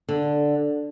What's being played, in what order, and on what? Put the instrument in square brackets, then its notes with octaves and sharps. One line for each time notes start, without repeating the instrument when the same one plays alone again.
[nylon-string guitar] D3